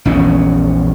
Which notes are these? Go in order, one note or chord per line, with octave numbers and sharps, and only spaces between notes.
A#1 E2 C#4